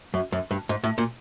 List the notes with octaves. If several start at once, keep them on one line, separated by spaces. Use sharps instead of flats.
F#2
F#2
G2
G#2
A2
A#2